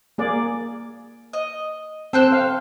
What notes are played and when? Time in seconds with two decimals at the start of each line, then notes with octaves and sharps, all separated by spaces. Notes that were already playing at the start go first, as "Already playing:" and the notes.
0.18 A#3 G#4 D5
1.33 D#5
2.13 C4 A4 C5 G5 F#6
2.32 F5